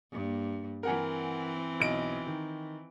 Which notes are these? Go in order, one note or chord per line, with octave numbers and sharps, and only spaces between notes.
G2 A#3
E3 C4 A#4 F#5 G#5
B1 D#5 D7
D#3